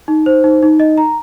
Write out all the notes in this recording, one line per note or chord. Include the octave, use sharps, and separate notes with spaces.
D#4
C5
D#4
D#4
D#5
A#5